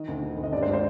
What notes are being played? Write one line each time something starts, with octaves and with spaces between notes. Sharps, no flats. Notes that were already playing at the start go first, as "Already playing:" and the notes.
Already playing: D#3 D#5
D2
D#3
D2
D#5
G2 D5
C5
G#3
C5